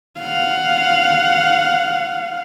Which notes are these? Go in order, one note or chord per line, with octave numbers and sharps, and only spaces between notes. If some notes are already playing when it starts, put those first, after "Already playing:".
F5 F#5